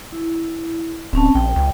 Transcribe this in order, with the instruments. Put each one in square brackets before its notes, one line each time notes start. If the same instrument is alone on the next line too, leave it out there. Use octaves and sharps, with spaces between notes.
[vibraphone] E4
[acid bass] D1 [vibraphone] C4 C#4 A5
[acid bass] A#1 [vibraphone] G5
[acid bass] C#2